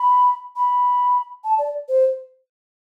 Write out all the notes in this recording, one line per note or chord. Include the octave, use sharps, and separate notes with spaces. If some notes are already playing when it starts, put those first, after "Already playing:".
Already playing: B5
B5
A5
D5
C5